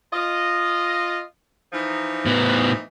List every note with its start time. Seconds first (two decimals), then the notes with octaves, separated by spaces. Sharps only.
0.13 F4 D#5
1.73 E3 F3 D#4
2.26 A2 B3